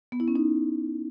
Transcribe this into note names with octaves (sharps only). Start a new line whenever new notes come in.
B3
E4
C#4
D#4